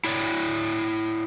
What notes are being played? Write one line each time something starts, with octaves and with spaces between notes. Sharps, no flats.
E4 C#5 D5